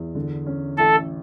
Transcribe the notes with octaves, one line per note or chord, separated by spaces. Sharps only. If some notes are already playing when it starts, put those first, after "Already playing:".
Already playing: E2
D3
C#4
A1 A4